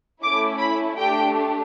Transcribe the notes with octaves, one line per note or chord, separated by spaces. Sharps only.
A3 C#4 E4 D6
B5
A3 D4 G4 G5